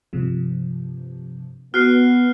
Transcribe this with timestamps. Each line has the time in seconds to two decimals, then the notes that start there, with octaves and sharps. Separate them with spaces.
0.13 G2 C3 F3
1.74 B3 F#4 F6 F#6 C7